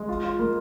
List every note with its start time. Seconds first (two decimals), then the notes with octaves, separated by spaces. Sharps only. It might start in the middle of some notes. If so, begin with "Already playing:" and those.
Already playing: G#3
0.09 F4
0.24 F4
0.39 A#3